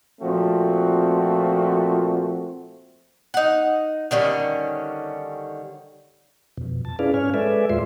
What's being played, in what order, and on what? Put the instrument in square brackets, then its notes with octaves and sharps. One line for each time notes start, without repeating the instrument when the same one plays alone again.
[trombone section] A#2 F3 A3 C4 F#4
[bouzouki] D#4 F#5
D3 D#3 G3 C#4
[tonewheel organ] F2 B2
A5
C#4 E4 G#4 B4 D5 F5
G#2 C#4 C#5 G#5 F6
G#3 A4 B4 D5 E5 G#5
D#2 A2 G#3 F4 E5 C6